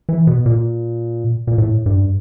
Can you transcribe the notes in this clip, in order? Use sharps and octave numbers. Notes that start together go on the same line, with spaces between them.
E3
B2
A#2
A#2
A2
G2